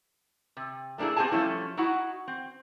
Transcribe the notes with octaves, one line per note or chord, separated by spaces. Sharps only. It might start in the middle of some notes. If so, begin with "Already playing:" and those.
C3
A3 A#3 D4 E4 G#4
B3 C4 G4 G#4 G#5 A5
F3 G3 A3 C#4 E4
D#4 E4 F#4 F#5
C4